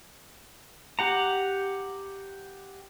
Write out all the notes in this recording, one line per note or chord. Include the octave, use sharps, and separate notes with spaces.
G4 F#5 A#5